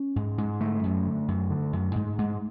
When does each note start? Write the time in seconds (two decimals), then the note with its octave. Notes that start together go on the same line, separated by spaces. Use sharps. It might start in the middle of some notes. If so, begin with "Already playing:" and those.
Already playing: C#4
0.16 G#2
0.38 G#2
0.60 D3 A3
0.83 F#2
1.06 D3
1.28 F#2
1.50 D3
1.73 F#2
1.95 G#2
2.18 G#2